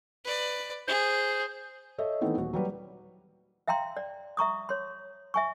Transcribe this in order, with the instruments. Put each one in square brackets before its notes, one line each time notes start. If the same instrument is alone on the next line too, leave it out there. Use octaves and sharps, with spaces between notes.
[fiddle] B4 D5
[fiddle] G#4 [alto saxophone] C5
[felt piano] A4 C#5 D#5 E5
D#3 E3 A3 B3 C4
D#1 F#4
F#3 G3 B4
[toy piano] E5 F5 G5 A#5 C6
D5
E5 A#5 C#6 D#6
C#5 C6
E5 G#5 C#6